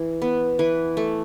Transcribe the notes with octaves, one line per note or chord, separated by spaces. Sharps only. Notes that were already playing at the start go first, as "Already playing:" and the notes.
Already playing: E3
B3
E3 B4
A3